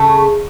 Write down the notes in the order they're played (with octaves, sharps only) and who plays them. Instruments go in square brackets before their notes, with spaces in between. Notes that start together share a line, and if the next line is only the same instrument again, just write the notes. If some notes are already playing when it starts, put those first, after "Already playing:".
Already playing: [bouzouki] C#3 A3